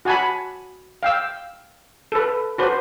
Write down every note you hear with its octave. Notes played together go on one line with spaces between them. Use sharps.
F#4 F#5 G#5 A5 B5
F5 G5 E6
A4 B4
F#4 B4 C5